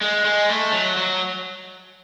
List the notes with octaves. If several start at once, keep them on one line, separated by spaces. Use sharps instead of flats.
G#3
G#3
A3
F#3
F#3